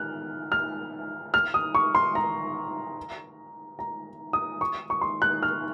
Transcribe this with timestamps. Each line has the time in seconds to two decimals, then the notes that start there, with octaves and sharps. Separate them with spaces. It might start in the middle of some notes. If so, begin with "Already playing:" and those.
Already playing: F6 F#6
0.52 F6
1.34 F6
1.54 D#6
1.75 C#6
1.95 C6
2.15 A#5
3.79 A#5
4.33 D#6
4.61 C#6
4.90 C#6
5.01 C6
5.22 F#6
5.43 F6